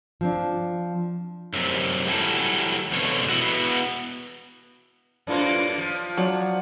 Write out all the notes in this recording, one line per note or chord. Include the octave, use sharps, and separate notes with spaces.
F3 C4 D4
F#2 C3
E3 F#3 G3 A4
F2 B2 D3 C#5
B3 E4 F#4
F#2 A2 A#3 D4 F4 C5
F3
F#3 D4